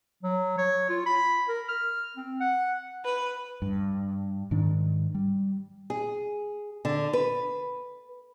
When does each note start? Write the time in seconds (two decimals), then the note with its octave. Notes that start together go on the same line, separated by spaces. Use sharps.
0.23 F#3
0.58 C#5
0.89 F4
1.06 B5
1.49 A#4
1.69 F6
2.17 C4
2.40 F#5
3.05 B4
3.62 G2
4.51 G#2 D#3 D4
5.14 G3
5.90 G#4
6.85 D3
7.13 B4